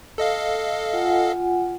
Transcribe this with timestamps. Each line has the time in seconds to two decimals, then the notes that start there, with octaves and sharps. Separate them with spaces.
0.18 A4 D#5 F5
0.93 F4 F#5 G#5